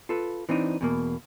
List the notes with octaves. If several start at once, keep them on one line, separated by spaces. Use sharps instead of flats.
F4 A4 B4
E3 C4 D4 D#4
E2 B2 A#3